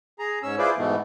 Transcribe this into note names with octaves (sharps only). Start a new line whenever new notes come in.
G#4 A#5
G#2 C#4 E6
E4 F4 G#4 B4 C5 D5
G#2 B2 E3 A3 B3